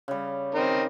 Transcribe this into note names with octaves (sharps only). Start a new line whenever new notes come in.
C#3 G3
C4 D#4 A#4